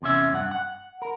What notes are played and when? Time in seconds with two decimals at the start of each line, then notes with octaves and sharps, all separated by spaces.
0.02 E2 C3 C#4 E5
0.32 G2 F#5
0.51 F#5
1.02 A#4